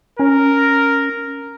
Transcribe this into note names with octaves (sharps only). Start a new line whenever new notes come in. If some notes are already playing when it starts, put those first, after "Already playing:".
C#4 A#4